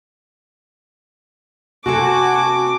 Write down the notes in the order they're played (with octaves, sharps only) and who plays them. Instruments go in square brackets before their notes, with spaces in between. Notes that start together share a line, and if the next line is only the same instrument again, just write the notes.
[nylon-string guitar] C3 G#4 A4 [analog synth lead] F#4 [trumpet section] G#5 A5 [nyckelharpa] D6